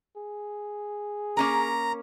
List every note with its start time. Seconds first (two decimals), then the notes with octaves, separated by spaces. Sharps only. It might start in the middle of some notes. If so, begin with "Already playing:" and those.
0.17 G#4
1.37 A#3 C#4 A#4 A#5